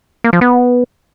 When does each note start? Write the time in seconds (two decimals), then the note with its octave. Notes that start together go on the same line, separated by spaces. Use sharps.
0.24 A#3
0.33 F3
0.41 B3